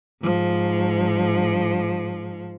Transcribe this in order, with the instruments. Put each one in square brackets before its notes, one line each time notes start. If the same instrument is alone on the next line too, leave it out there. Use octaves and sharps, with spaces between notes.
[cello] G#2 F3